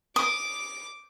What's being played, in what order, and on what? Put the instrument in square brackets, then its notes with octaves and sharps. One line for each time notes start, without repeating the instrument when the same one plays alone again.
[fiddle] D6 [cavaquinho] D#6